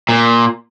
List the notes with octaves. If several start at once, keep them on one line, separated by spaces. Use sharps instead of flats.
A#2